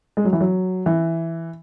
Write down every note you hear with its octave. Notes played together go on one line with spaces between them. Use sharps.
G#3
F#3
E3
F#3
E3